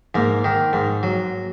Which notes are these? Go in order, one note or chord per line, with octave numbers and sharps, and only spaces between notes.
G#2 A#3
D#3
G#2
F#3